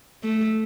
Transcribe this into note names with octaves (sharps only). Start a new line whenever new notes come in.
A3